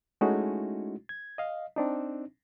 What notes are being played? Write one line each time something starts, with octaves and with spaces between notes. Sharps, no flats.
G#3 A3 C#4 D#4 E4 F#4
G#6
D#5 F5
C4 D4 D#4